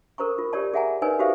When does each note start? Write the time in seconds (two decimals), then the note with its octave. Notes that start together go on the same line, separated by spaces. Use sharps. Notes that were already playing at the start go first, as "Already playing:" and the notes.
0.18 A4 A#4 C5 A#5 C#6
0.38 F4
0.53 G4 A#4 C#5 D5 A5
0.74 G#4 E5 F#5 G#5 A#5
1.02 D#4 A#4 B4 C#5 D5 G#5
1.19 F#4 G4 A4 C5 E5 F5